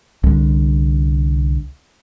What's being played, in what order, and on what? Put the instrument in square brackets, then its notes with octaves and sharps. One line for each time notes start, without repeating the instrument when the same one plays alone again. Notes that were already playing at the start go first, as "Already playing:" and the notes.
[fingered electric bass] C2 D3